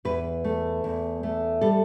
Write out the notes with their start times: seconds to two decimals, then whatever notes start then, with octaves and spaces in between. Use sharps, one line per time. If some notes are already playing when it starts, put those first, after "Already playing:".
0.05 E2 B4
0.44 A3
0.84 E2
1.23 A3
1.61 G3 A4